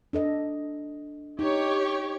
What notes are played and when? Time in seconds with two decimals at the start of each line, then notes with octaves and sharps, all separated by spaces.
0.13 D4 A4 D#5
1.39 D#4 G4 C#5